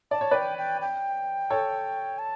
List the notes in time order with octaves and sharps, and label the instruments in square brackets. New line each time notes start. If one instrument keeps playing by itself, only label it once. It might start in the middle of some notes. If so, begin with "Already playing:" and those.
[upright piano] D5 [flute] A5
[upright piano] C#5
[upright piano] B4 D5 [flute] G5
[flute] G5
G5
[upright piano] A4 C#5
[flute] A5